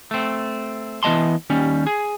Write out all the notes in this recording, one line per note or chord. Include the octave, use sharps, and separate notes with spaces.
A3 C4
E3 B3 D#5 A5 C6
D#2 G3 C#4
G#4